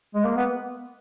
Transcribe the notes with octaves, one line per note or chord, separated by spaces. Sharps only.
G#3
A#3
B3